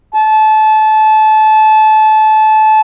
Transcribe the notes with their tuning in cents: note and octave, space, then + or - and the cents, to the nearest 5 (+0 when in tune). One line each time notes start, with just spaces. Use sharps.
A5 -25